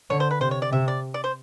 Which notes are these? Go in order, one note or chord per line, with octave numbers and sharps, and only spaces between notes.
D3 C#5
C5
B4
C3 C5
C#5
D5
C3 E5
D5
D5
C5